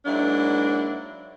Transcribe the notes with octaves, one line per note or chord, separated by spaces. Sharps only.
G#2 F#3 A#3 D4 E4